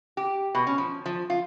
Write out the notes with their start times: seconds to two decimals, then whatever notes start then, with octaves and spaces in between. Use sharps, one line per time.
0.17 G4
0.55 B2
0.67 C#4
0.78 F3
1.06 F3
1.30 F4